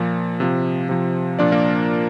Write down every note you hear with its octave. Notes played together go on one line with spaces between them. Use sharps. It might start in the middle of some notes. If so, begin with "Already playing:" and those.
Already playing: A#2 F3
C3 F3
C3 F3
A#2 F3 D4 D5
A#3 A#4